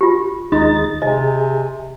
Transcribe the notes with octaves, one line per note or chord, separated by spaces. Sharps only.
F4 G4
D#2 G#3 D#4 A6
C3 G#4 D#5